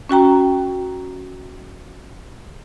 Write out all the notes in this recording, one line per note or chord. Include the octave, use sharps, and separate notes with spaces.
C#4 F#4 G5 A#5